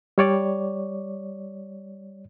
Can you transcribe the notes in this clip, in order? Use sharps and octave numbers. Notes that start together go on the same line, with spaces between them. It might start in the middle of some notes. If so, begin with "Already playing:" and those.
G3 C#5 D5